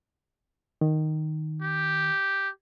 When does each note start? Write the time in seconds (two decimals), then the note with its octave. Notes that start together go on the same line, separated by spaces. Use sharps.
0.81 D#3
1.62 G4